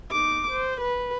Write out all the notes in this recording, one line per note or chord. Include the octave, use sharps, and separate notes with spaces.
D#4 D6
C5
B4